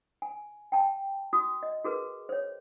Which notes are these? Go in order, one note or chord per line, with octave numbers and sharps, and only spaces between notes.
G#5
G5 A5
F#4 D#6 E6
D#5
F#4 G#4 A#4 B4
C5 C#5